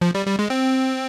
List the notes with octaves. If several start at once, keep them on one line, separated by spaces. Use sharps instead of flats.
F3
G3
G3
G#3
C4